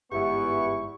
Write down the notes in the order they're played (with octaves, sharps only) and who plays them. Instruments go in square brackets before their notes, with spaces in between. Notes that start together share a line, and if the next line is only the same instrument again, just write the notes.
[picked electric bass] G1 G#2 [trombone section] E2 B3 E4 [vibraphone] G4 [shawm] C#6